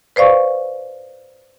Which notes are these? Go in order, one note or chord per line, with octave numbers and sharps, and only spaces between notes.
B4 C5 D5 F5 C#6